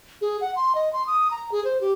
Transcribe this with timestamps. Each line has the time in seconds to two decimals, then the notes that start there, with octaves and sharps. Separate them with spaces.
0.21 G#4
0.41 F#5
0.56 C6
0.75 D#5
0.93 C6
1.07 D#6
1.31 A#5
1.52 G#4
1.65 C5
1.81 G4